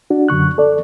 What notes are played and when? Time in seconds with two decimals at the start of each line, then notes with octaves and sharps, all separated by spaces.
0.10 D4 F#4
0.28 F#2 D3 C#6 F#6
0.58 A4 D5